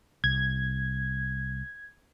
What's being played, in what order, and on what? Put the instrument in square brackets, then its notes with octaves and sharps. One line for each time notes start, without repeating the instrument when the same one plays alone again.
[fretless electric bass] C2 [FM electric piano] G#6